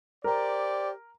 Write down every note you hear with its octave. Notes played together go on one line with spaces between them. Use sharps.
G4 A#4 C5 D5